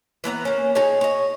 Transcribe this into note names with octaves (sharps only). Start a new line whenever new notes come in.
E3 B3 C#5 A#5
A#3 C#4
D#4 G#4 C#5 G#5
C#5 D#5